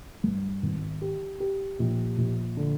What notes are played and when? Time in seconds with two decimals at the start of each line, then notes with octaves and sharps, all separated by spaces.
0.24 G2
0.63 G#1
1.02 G4
1.40 G4
1.79 A#1
2.18 A#1
2.57 D3